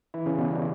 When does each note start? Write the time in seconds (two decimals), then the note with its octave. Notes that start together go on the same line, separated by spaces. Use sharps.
0.14 E3 E4
0.26 C#3 C#4
0.38 B2 B3
0.51 G3